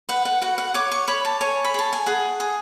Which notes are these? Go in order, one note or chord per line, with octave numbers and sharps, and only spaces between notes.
B4 F#5
F#5
F#4 F#5
F#5
C#5 D6
C#6
C#5 B5
A5
C#5 G#5
B5
G#4 A5
G#5
G#4 F#5
G#4